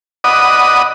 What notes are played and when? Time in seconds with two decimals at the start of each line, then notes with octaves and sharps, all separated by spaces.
0.24 D5 D#5 F#5 B5 D#6